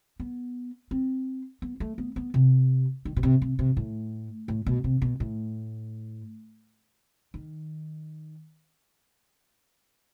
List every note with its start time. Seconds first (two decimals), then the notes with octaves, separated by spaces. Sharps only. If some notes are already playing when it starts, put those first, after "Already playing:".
0.20 B3
0.91 C4
1.62 B3
1.80 A3
1.98 B3
2.16 B3
2.34 C3
3.05 D#3
3.16 B2
3.23 C3
3.42 C3
3.59 C3
3.77 A2
4.48 A2
4.66 B2
4.84 C3
5.02 B2
5.20 A2
7.34 D#3